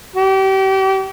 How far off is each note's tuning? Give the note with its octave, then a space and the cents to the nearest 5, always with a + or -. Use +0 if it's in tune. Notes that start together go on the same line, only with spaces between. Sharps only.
G4 -35